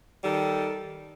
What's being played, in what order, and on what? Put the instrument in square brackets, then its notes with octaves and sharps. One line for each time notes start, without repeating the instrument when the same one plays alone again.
[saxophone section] D#3 G3 A4